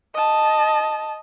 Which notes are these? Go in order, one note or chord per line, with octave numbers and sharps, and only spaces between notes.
D#5 A5